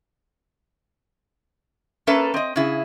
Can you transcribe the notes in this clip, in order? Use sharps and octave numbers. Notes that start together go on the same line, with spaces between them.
A#3 C#4 A4 B4 E5 A#5
C4 D#5
C#3 E4 G#4